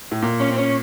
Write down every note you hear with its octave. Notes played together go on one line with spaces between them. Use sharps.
A2
A#2
C#4
C4
C#4